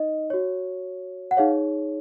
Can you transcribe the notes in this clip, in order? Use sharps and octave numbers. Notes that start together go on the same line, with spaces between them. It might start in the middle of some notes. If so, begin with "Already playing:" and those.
Already playing: D#4 D#5
F#4 C#5
F#5
D#4 G#4 C#5 F5